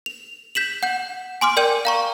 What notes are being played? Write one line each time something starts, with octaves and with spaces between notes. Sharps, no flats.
F7
G6 B6 E7 F#7
F#5 G6
G#5 C6 D6 F6
A#4 D5 G5 G6 D#7
F5 A#5 C#6